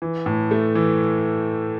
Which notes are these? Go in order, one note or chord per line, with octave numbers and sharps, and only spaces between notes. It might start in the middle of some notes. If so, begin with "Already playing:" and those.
E3
A2
A3
E3